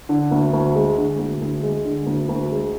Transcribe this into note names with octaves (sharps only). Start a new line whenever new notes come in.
D3
D2
D2
G#3
D3
D2
D2
G#3
D3
D2
D2
G#3